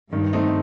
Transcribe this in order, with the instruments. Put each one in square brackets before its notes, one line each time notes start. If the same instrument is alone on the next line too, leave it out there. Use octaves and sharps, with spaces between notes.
[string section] G2 [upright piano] D#3
[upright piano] A3 C4 D#4